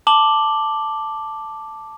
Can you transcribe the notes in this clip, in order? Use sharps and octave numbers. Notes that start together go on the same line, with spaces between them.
A5 D6 F#7 G7